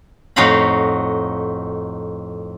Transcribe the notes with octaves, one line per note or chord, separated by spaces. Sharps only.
F2 A2 D#4 F#4 F5 B5